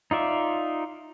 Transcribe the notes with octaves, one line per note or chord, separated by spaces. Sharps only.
D#4 F4 D5 E5